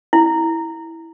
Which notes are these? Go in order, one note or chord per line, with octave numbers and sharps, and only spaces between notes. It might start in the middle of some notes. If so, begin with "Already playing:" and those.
E4